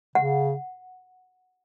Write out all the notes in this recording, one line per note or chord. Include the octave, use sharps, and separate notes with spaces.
C#3 F#5